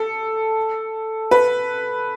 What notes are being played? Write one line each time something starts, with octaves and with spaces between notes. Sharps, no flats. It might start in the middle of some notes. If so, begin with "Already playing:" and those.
Already playing: A4
B4